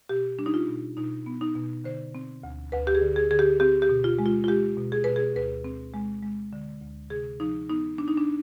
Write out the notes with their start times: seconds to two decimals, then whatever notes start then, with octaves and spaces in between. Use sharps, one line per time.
0.09 B2 G4
0.39 G3 D4
0.46 D#4
0.54 F4
0.69 B2
0.97 B2 D#4
1.26 B3
1.41 D#4
1.56 B2
1.84 D3 C5
2.15 C4
2.43 D2
2.72 D2 B4
2.87 G4
2.95 G#4
3.02 D3
3.16 G#4
3.31 D3 G#4
3.39 G4
3.60 C4 G4
3.82 G4
3.89 B2
4.04 F4
4.19 G#3
4.26 F4
4.44 F4
4.48 G#3 G4
4.77 B2
4.92 G#4
5.04 B2 B4
5.16 G#4
5.35 D2 B4
5.64 C4
5.94 G#3
6.23 G#3
6.53 D3
6.82 D2
7.10 C3 G#4
7.40 F3 D#4
7.69 B3 D#4
7.98 B3 D4
8.08 D#4
8.18 D4